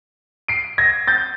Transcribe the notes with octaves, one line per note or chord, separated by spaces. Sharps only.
C7 D7
G#6 A#6
G6 A6